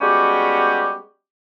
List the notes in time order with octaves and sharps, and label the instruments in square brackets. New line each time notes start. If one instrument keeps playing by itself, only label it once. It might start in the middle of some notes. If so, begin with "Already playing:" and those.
[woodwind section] G3 G#3 B3 C#4 F#4 G4